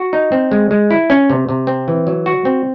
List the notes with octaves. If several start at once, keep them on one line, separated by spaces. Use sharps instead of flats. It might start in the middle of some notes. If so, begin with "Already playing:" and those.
Already playing: F#4
D#4
C4
G#3
G#3
E4
C#4
C3
C3
C4
E3
F#3
F#4
C4